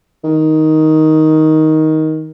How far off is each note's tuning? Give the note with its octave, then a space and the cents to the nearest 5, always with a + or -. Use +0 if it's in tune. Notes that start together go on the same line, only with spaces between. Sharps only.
D#3 +10